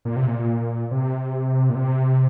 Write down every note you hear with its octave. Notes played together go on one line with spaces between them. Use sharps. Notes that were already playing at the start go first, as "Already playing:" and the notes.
A#2
C3
A#2
C3
A#2
C3